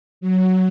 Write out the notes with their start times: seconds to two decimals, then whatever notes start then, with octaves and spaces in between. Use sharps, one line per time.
0.21 F#3